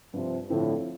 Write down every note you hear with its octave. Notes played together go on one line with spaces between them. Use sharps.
G2 C3 F3
A2 D3 F3 C4